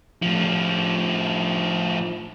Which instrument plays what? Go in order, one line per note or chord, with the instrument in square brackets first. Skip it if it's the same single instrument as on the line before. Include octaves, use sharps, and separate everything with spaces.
[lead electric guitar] A2 F3